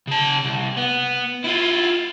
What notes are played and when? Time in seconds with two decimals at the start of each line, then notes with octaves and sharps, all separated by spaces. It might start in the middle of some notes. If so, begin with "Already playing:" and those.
0.07 C#3 A5
0.44 C2
0.77 B3
1.44 E4 F4